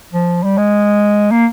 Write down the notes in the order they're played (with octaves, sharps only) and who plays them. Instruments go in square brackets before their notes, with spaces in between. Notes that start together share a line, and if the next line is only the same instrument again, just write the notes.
[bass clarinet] F3
G3
G#3
A#3